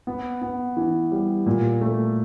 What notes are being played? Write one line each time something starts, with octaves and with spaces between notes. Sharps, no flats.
B3
B3
E3
G3
A#2
A3